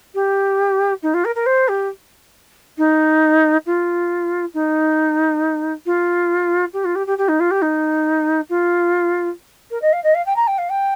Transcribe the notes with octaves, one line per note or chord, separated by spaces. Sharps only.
G4
D#4
F4
A#4
A#4
C5
G4
D#4
F4
D#4
F4
G4
F4
G4
G4
G4
D#4
F4
G4
D#4
F4
A#4
D#5
F5
D#5
F5
G5
A#5
G5
F5
G5